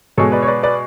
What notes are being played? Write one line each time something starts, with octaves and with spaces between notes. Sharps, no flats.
B2 G#3 A4 C#5
B4 D5
C#5
B4 D5
B4 D5